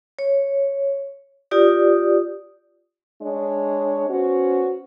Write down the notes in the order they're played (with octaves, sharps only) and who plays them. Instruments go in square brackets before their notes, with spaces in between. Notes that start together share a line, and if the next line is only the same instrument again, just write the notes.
[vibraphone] C#5
F4 G4 D5 D#6
[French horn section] G#3 D4 C#5
B3 C#4 F#4 C5 C#5